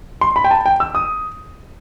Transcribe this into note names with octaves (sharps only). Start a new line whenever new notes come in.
C6
B5
G5
A5
G5
E6
D#6